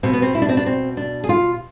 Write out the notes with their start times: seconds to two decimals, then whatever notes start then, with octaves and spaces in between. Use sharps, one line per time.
0.03 B2 C4
0.13 B3
0.22 C4
0.35 E4
0.42 D4
0.49 C4
0.57 D4
0.66 C4
0.97 D4
1.24 G#4
1.29 F4